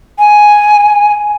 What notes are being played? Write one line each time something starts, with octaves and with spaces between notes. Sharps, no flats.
G#5